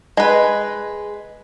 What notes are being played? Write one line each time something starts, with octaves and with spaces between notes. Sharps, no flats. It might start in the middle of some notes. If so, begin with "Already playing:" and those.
G#3 B4